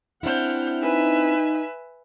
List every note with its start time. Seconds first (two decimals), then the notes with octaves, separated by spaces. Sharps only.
0.23 C4 D4 E4 F#5 F6 G6
0.83 D#4 B4 E5 G#5